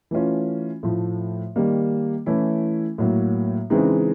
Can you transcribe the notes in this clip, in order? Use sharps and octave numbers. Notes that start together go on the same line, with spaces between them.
E3 A3 C#4 F4
A2 F3 A3
D#3 G3 A#3
E3 A3 C#4 E4
A2 F#3 A#3
C#3 E3 G#3 C4 D#4